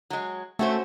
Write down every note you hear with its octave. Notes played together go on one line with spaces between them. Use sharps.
F#3 G#3
A3 C#4 F#4 C5